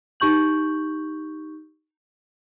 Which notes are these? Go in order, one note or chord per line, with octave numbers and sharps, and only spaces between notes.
D#4 G4 C#6 G6 F#7